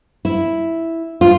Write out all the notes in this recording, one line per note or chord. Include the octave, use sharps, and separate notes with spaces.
E4
F4